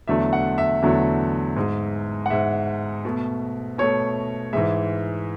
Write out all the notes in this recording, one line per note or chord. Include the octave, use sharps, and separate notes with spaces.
E2 D3 F#3 A3 E5
F#5
E5
E2 D3 F#3 A3
G#2 G#3
F#5
G#2 G#3 E5
B2 A3
B2 A3 C#5
G#2 E3 G#3 E5